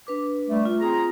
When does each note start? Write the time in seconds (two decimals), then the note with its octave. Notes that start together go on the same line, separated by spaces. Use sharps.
0.07 D4 B4 D6
0.46 G3 A3
0.65 F4
0.80 C4 G#4 A#5